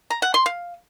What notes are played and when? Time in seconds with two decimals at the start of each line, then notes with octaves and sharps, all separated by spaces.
0.10 A#5
0.22 F#5
0.34 C6
0.46 F5